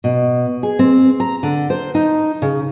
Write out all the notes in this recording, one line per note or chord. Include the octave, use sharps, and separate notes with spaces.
B2
G#4
C4
A#5
D3
C5
D#4
C#3